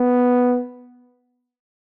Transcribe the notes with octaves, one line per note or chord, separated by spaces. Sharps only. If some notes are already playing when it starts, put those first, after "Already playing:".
Already playing: B3